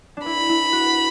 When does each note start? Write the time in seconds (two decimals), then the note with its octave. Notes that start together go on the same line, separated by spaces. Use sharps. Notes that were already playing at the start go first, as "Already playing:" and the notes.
0.17 D4
0.26 E4 B5
0.49 E4
0.72 F#4